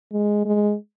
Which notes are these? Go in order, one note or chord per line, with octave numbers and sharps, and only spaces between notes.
G#3
G#3